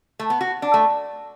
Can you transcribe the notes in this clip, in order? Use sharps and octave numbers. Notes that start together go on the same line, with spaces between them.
A3
B3
F#4
D4
A3